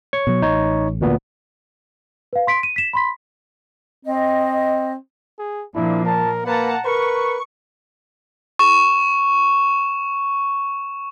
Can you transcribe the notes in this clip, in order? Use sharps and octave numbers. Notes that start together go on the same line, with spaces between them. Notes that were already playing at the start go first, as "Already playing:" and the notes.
C#5 C#6
B2 F#3
A1 D#4 C#5
D2 A#2 B3
B4 F5
C6 B6 D7
D#7
B6 E7
B5 C6 B6
C4 D#5
G#4
A#2 F3 D4 E4
A#4 A5
A#3 B4 F#5 A5 A#5
A#4 B4 C#6
C#6 E7